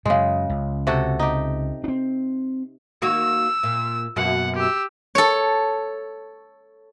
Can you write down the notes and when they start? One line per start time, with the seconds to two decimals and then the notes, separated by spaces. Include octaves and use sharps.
0.05 F#2 C#3 G#3
0.50 C#2
0.87 C3 F#4 A4
1.19 D#4 G4
1.84 C4 D4
3.02 D#3 A#3 F#4 E6
3.63 A#2
4.17 F#2 B2 A#3 F#5
4.56 G4 E6
5.15 A4 C#5